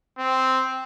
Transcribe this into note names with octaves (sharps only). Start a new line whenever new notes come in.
C4